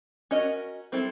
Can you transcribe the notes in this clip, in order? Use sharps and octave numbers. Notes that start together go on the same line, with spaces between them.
C#4 F#4 A#4 D#5
G3 C4 E4 A4